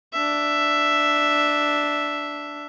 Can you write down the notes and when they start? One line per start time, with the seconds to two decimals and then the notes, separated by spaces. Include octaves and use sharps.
0.13 D4 E5